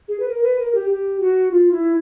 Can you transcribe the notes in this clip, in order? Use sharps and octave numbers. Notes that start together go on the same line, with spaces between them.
G#4
B4
A#4
B4
A#4
G4
G4
F#4
F4
E4